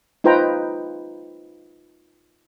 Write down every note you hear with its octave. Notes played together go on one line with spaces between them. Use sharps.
D#4 F4 B4 C5 G5 A#5